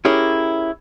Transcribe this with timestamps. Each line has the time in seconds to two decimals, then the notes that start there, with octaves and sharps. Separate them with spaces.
0.05 C#4 E4 G4 G#4 A#4